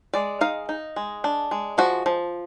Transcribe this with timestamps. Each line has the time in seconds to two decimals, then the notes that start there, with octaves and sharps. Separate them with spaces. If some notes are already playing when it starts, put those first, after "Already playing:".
0.14 G#3 D5
0.41 D#4 F5
0.69 D#4
0.96 G#3
1.24 D4
1.51 G#3
1.78 F3 F#4
2.06 F3